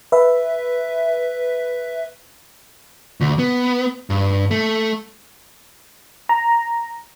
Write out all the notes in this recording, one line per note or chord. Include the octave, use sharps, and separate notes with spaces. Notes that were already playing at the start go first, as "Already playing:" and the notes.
B4 E5
D2
B3
G2
A3
A#5